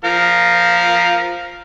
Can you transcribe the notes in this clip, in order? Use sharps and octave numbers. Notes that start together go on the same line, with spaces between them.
F3 A#4 F5